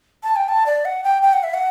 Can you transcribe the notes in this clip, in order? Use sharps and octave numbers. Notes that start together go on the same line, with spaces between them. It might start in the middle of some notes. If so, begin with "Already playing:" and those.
A5
G5
A5
D5
F#5
G5
G5
F#5
E5
F#5